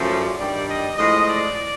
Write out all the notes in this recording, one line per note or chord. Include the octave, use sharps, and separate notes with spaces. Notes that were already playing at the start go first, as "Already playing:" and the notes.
Already playing: F#2 C#3 F3 A3
D5
G2 D#3 G3 D5
D#5
A2 F3 G#3 D#5
D5